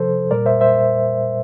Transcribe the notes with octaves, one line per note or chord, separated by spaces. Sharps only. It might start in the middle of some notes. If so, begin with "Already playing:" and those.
Already playing: C3 F3 A4 C5
A#2 G3 A#4 D5
C5 E5
C5 E5